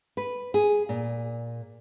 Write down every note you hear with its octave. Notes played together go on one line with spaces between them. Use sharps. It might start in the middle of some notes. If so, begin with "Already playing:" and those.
B4
G#4
A#2